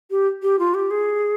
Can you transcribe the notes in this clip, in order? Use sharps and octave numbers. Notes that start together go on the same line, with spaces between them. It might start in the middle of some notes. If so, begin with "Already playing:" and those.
G4
G4
F4
G4
G#4